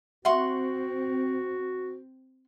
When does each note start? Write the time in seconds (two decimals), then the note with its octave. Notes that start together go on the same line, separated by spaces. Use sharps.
0.25 C4 F#4 E5 F#5 C6 C#6